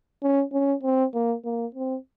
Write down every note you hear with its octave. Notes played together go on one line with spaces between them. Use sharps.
C#4
C#4
C4
A#3
A#3
C4